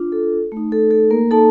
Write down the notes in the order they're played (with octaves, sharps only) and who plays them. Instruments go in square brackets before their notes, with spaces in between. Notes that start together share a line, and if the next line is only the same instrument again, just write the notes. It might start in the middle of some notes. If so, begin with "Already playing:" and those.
Already playing: [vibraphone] D4 F4
A4
A3 D#4
A4
A4
A#3 A#4
A#3 D#4 A4 A5